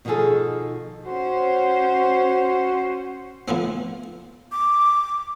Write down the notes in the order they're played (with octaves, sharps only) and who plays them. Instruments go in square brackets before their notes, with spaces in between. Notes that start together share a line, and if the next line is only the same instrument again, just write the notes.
[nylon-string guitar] B2 D#3 F3 F4 G#4 A4
[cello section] C#4 C5 [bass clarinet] F#4
[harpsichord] A2 F3 B3 C4
[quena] D6